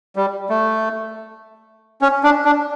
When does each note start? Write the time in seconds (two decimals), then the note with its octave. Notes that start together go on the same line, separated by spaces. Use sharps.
0.16 G3
0.50 A3
2.01 C#4
2.24 D4
2.45 D4